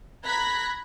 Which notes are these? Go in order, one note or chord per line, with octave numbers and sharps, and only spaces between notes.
A#5 B5 F#6 G#6 A#6 B6